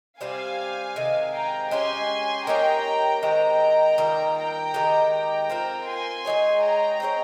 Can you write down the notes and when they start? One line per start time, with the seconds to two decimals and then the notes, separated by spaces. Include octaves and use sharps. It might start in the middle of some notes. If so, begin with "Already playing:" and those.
0.20 C3 G3 C4 G4 F5 G#5
0.96 C3 D#3 G#3
1.34 G5 A#5
1.71 G#3 C#4 G4 G#5 C6
2.47 A#3 D#4 G4 C#5 G5 A#5
3.23 D#3 G#3 C4 G4 G5 A#5
3.98 D#3 G3 A#3 F4
4.36 G5 A#5
4.74 D#3 G#3 D#4 G4
5.12 G5 A#5
5.49 C4 F4 A#4
5.87 G#5 C6
6.25 G#3 D#4 G#4 C#5
6.62 G5 A#5
7.00 C4 D#4 G#4 C#5